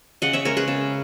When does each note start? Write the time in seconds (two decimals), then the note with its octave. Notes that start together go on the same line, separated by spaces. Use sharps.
0.22 C#3 D#5 F#5
0.33 C#5 E5
0.45 G#3 C#4 A#4 C#5
0.57 G#4 B4
0.68 C#3